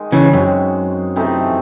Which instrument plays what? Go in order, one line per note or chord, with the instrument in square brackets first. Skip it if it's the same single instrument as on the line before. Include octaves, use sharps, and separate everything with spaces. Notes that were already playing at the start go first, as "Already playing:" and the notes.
Already playing: [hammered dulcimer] D#3 G#3 D#4
[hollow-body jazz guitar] C#3 E3
[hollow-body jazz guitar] F#2 [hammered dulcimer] G#3 C4 D#4 F#4
[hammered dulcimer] C3 E3 A3 D#4